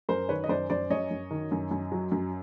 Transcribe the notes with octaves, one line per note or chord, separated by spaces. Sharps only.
F#2 A#4 C5
D#3 B4 C#5
D#5
F#2 C5 D5
F#2 C5 D5
F#2 C#5 D#5
F#2
D#3
F#2
F#2
F#3
F#2